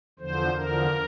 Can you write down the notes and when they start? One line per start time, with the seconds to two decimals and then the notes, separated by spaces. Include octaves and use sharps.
0.19 E2 D3 F3 C5
0.56 E2 D3 F3 A#4